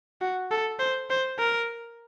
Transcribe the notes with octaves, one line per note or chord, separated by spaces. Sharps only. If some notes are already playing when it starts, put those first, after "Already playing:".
F#4
A4
C5
C5
A#4